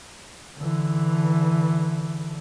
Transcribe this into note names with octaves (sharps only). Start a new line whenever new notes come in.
D3 E3